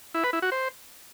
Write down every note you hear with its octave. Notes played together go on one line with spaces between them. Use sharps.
E4
B4
E4
F#4
C5